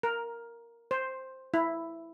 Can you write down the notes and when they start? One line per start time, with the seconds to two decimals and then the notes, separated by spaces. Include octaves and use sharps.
0.03 A#4
0.91 C5
1.54 E4